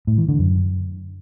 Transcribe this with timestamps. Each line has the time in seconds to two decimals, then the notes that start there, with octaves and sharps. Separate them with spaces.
0.07 A2
0.18 E3
0.29 D3
0.39 F#2